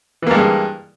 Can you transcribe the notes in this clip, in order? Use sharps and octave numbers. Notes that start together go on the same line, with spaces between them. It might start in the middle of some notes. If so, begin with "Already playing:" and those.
G2 E3 G#3 A#3